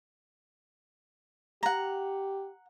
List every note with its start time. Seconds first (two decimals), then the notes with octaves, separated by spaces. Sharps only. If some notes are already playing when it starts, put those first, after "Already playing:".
1.63 G4 F#5 A#5